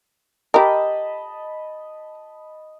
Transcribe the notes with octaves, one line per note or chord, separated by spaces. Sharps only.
G4 A#4 D#5 A5 B5